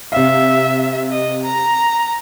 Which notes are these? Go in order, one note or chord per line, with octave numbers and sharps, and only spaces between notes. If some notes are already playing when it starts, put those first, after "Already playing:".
C3 E5 F5
D#5
A#5